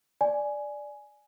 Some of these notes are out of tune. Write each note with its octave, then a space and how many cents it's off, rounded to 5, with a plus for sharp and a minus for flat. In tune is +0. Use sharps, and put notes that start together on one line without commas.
D5 +0 G#5 +10